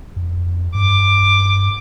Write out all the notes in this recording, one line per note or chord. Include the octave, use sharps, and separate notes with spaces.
F2
G2 D6